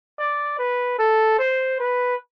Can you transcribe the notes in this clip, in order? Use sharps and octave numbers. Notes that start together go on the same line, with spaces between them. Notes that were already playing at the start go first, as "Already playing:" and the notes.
D5
B4
A4
C5
B4